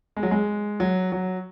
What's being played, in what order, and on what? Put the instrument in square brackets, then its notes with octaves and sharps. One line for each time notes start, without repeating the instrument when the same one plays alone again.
[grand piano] G#3
F#3
G#3
F#3
F#3